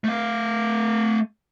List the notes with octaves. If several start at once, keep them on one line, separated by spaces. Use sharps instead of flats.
A3 F5